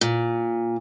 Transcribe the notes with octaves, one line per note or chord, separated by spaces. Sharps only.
A#2